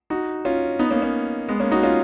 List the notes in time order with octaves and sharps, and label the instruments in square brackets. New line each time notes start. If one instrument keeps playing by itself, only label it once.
[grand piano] D#4 F#4
C#4 F4
B3 D#4
A#3 C#4
A#3 C#4
G#3 B3
A#3 C#4
D#4 F#4
C#4 F4